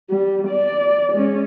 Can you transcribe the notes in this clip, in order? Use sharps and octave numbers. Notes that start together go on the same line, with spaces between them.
G3
D5
G#3 C#4